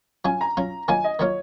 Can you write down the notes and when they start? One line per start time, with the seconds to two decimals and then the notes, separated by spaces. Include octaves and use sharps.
0.25 F#3 C#4 F4 G#5
0.41 A#5
0.57 F#3 C#4 F4
0.88 D#3 F#3 A#3 F4 G#5
1.04 D#5
1.19 D#3 F#3 A#3 F4 C#5